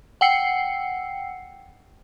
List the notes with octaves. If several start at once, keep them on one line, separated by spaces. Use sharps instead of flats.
F#5 G5 E6 C7 C#7